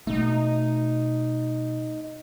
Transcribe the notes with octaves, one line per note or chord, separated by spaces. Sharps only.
B2 A3 D#4